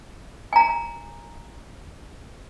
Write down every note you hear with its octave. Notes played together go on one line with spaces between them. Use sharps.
G#5 A#5